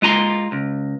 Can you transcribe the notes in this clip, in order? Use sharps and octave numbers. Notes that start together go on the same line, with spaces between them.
G#3 F4 A#5 C6
C#2